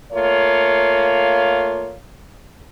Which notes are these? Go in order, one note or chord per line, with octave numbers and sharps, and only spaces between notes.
A3 A#3 F4 C#5